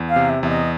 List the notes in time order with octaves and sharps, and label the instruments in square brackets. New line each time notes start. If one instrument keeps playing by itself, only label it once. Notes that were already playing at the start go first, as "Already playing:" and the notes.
Already playing: [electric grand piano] E2
[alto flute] F5
[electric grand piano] C3
[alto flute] E5
[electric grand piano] E2 [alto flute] E5
[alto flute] D#5